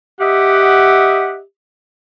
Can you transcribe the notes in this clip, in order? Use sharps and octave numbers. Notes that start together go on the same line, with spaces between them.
G4 D#5 E5 F#5